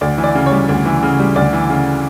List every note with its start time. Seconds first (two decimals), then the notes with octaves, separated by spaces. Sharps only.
0.01 D2 D5
0.18 E3
0.24 D5
0.35 C#3
0.46 C#5
0.52 G3
0.69 D2
0.85 E3
1.03 C#3
1.19 G3
1.36 D2 D5
1.53 E3
1.70 C#3